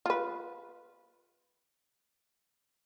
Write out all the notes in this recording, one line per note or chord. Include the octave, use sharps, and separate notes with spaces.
F4 B4